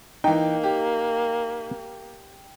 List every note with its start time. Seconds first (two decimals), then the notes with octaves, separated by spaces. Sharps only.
0.24 E3 A#3 D#4 G5
0.64 G4